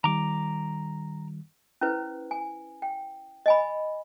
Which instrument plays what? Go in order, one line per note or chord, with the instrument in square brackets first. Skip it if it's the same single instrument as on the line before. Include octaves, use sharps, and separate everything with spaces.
[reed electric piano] D#3 G3 [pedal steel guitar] A#5 D6
[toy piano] C#4 E4 B4 C5
G#5
G5
D#5 G#5 B5